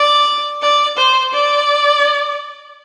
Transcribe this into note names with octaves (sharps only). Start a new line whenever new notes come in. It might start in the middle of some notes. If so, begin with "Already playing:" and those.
Already playing: D5
D5
C5
D5